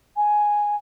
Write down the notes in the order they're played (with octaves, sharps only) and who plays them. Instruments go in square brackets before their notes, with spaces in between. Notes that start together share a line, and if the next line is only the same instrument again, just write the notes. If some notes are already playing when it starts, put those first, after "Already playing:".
[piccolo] G#5